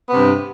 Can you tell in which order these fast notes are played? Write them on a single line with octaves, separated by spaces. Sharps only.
B3 C3 G2